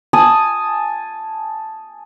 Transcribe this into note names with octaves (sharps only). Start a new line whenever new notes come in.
G#5 A5 D#6